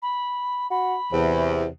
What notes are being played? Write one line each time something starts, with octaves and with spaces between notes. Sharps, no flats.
B5
F#4 B5
E2 C3